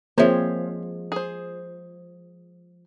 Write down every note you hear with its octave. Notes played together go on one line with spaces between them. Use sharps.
F3 G#3 A#3 C4 C5 C#5 E5
G#4 C5